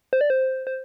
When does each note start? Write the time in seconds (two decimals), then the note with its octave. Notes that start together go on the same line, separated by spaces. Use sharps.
0.13 C5
0.21 D5
0.30 C5
0.67 C5